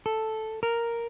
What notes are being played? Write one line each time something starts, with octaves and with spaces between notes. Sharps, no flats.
A4
A#4